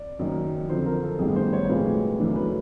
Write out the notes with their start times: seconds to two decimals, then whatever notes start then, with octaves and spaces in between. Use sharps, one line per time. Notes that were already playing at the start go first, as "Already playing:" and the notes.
Already playing: D5
0.19 F#1 F#2 D#3
0.69 F2 D3 F3 C5
0.85 A#4
1.03 A4
1.19 A1 G2 D#3 G3 B3 G#4
1.36 C5
1.53 C#5
1.69 B1 A2 F3 G#3 B4
2.20 F#2 C#3 E3 A3 D4
2.36 B4